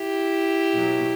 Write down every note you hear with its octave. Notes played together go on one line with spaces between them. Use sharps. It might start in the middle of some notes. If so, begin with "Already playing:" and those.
Already playing: E4 G4
B2 F#3